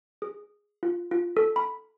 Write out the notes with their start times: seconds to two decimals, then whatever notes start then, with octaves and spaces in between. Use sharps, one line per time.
0.22 G#4
0.83 F4
1.11 F4
1.37 A4
1.56 B5